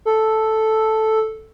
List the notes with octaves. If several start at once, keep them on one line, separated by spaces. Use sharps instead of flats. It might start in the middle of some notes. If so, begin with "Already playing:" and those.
A4